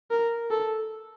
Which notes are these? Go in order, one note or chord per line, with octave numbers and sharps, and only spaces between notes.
A#4
A4